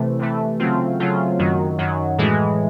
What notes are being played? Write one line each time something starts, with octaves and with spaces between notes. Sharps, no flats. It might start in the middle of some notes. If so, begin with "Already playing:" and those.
Already playing: C3 E3 A3
C3 E3 A3
C#3 F#3 A3 C4 F4
C#3 F#3 A3 C4 F4
F#2 D#3 F#3
F#2 D#3 F#3
A2 E3 G#3